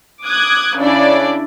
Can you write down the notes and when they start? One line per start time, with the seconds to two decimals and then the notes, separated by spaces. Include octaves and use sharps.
0.24 D6 D#6 F#6 G#6
0.78 C#3 D4 E4 D5